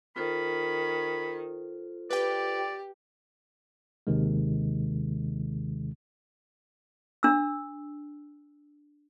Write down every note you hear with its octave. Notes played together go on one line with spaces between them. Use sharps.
D#3 F4 A4 C5 B5
G4 B4 D5 G5
D#2 C3 D#3 G#3
D4 E6